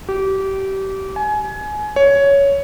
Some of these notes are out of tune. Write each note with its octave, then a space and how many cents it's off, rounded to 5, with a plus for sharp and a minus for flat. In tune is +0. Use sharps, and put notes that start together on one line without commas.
G4 -25
G#5 +25
C#5 +10